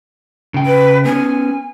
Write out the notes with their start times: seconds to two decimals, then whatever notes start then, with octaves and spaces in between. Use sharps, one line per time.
0.54 C#3 G5
0.66 B4
1.05 B3 C#4 G#5